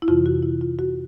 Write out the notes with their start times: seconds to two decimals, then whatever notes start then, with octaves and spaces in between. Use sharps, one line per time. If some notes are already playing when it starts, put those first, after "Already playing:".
0.02 E4
0.08 F2 C3 E3 F4
0.26 F#4
0.43 E4
0.61 F4
0.79 F#4